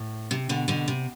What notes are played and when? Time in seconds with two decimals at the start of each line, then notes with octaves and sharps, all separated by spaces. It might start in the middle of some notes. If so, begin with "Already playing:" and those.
Already playing: A2
0.31 C3
0.49 B2 D3
0.68 B2 D3
0.88 C3